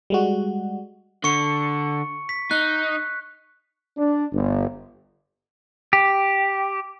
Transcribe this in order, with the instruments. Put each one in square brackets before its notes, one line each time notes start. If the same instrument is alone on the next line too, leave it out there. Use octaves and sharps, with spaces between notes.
[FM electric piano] G3 G#3 F#4
[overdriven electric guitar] D3 [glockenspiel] C#6 C#7
[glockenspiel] B6
[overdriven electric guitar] D#4 [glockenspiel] F#6
[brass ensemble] D4
G1
[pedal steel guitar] G4